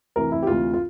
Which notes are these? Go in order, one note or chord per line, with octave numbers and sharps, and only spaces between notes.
D2 C3 E3 A#4
E4
G4
D2 C3 E3 F4
F4